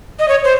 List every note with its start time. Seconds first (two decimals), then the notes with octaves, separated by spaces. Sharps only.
0.19 D#5
0.28 C#5
0.44 C5